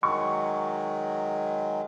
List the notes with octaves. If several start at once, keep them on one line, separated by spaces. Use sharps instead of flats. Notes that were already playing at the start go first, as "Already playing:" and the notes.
D#3 F#3 G#3 C#6